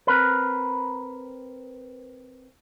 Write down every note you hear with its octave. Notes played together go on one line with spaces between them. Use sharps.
C4 A#4 B4